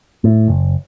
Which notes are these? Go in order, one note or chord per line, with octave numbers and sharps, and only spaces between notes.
A2
F#1